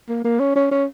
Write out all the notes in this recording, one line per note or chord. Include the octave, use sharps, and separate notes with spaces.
A#3
A#3
C#4
C#4
C#4